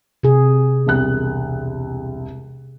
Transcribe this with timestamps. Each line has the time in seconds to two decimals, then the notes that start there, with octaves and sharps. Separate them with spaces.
0.23 C3 G#4
0.86 E1 C2 F#6